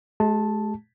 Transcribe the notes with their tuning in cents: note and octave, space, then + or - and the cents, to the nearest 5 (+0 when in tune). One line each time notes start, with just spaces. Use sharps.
G#3 +45 G4 +0 A5 +0